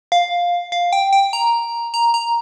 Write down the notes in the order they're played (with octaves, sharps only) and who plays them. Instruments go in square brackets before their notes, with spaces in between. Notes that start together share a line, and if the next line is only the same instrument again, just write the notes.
[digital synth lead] F5
F5
G5
G5
A#5
A#5
A#5